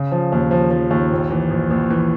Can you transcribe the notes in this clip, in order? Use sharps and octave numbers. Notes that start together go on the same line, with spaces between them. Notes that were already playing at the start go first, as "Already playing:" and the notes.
Already playing: C#3
F3
D#2
F3
F3
D#2
A#1
E3
A#1
A#1
E3